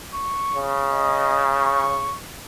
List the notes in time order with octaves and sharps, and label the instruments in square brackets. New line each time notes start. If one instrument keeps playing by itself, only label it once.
[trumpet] C#6
[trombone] C#3
[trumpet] D#5
C#6